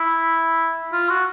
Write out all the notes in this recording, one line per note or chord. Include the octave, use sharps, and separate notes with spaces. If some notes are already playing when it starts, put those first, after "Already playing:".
Already playing: E4
F4
F#4